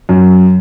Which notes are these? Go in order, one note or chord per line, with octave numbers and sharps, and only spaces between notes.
F#2